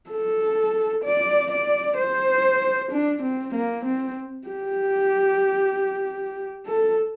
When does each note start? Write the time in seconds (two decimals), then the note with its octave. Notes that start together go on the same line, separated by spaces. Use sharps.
0.10 A4
1.04 D5
1.51 D5
1.97 C5
2.91 D4
3.22 C4
3.54 A#3
3.85 C4
4.48 G4
6.66 A4